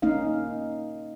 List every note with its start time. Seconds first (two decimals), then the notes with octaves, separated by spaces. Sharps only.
0.02 A#3 C#4 D#4 D#5 F5